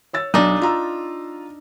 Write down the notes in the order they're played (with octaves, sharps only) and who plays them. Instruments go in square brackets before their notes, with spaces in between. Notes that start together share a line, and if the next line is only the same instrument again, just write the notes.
[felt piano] C#5 E6 A6
[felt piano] B1 [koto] D4 D#4
[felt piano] F4 A#5 E6